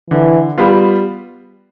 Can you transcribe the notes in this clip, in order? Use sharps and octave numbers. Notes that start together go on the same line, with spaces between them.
D3 E3
G3 B3 F4